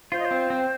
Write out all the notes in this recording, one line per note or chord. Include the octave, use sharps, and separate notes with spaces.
F4 C5
D#5
C4 C5
C4